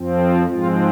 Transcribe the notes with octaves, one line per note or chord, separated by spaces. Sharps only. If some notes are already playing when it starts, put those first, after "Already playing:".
Already playing: F2 F3 C4
F4
G#2 F3 G#3 C4 F4